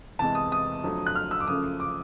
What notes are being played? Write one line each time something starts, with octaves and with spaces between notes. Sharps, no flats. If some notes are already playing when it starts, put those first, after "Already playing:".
E2 C3 E3 G#3 A5
D#6
D#6
F2 D3 F#3 A3
F#6
F6
E6
D6
F#2 C#3 F3 A3 D#6
D6